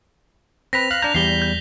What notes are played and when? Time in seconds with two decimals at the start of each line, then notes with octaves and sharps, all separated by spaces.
0.73 C4 B4 A#6 B6 F7
0.91 F5 F#6
1.02 D4 A#5 G6 A#6 F7
1.15 E2 G3 C7 G7
1.42 G6